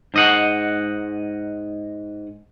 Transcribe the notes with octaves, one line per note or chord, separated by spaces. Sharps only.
G#2 D#5 F#5